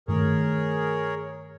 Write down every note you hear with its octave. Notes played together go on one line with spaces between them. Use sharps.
G2 D#3 A3 G#4 A#4 C#5